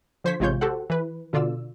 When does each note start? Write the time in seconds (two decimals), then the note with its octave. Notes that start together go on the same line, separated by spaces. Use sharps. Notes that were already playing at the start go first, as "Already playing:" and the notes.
0.24 D3 F3 C5 C#6 G#6 B6
0.40 A1 C3 G#3 F4 C#5 G6
0.61 F#4 G4 A4 C5 F#5
0.90 E3 B4
1.33 B2 D3 F4 D5 E6